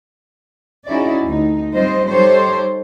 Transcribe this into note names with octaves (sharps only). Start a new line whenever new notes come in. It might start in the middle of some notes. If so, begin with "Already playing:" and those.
C#4 D#4 E4 F#4 G#4 D5
D2 D#4
G3 C4 F4 C5 D#5
G3 D#4 G4 A4 C5 C#5